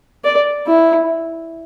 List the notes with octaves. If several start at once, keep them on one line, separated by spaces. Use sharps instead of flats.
D5
E4